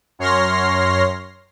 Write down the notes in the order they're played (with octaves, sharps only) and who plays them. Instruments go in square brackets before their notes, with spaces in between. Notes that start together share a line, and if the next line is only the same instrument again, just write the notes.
[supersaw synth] F#2 C#5 C6 F6 A#6 C7